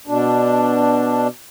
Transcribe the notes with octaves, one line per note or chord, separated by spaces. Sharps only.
B2 D4